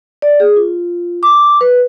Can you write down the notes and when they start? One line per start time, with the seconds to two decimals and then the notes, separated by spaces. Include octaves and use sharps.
0.22 D5
0.40 G#4
0.57 F4
1.23 D6
1.61 B4